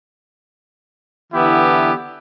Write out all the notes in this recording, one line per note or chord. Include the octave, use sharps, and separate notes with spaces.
D3 E3 B3 E4 G4